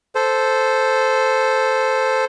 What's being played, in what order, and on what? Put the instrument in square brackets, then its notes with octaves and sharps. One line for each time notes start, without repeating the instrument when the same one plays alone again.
[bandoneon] A4 C5